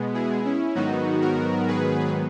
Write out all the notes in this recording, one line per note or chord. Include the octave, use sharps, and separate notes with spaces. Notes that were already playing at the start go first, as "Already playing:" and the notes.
Already playing: B2 G#3 B3
E4 G#4
C#4 E4
G#2 D#3 F#3 B3 D#4 F#4
F#4 A#4
G#4 B4